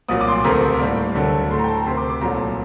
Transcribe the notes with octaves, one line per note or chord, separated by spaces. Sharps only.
C2 A#2 F#3 D#6
D6
C6
D6
D2 C3 D#3 A3 A#5
A2 G3 A#3
D2 D3 F#3 A3
A2 A3 C6
A#5
G5
A5
A#5
D2 C3 D#3 C6
D6
D6
C2 A#2 F#3 A3 A#5